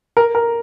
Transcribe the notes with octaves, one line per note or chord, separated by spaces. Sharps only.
A#4
A#4